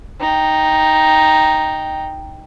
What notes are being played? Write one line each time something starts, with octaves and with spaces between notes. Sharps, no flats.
D#4 G5